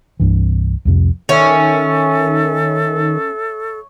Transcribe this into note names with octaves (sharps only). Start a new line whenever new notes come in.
C2 G2 E3
C2 F2 C3
D#3 C#4 A4 C#5 E5